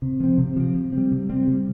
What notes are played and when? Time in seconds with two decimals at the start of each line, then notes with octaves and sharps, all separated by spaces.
0.02 C3
0.20 F3 C4
0.38 C3
0.56 F3 C4
0.75 C3
0.93 G3 C4
1.11 C3
1.29 G3 C4
1.48 C3